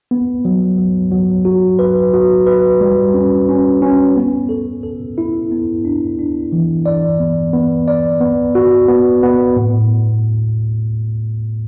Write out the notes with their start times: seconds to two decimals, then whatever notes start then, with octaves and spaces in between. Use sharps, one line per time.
0.11 B3
0.45 F#3
0.78 F#3
1.12 F#3
1.45 F#4
1.79 B4
2.14 F#4
2.46 B4
2.81 G3
3.14 C#4
3.49 C#4
3.82 C#4
4.16 B3
4.49 A4
4.83 A4
5.18 E4
5.52 B3
5.85 D4
6.19 D4
6.52 E3
6.86 D5
7.20 B3
7.53 B3
7.88 D5
8.21 B3
8.55 F#4
8.88 B3
9.23 B3
9.57 A2